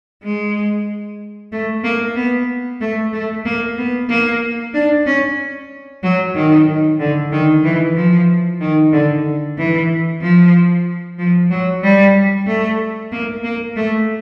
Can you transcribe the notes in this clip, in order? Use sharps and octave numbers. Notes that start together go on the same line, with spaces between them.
G#3
A3
A#3
B3
A3
A3
A#3
B3
A#3
D4
C#4
F#3
D#3
D3
D#3
E3
F3
D#3
D3
E3
F3
F3
F#3
G3
A3
A#3
A#3
A3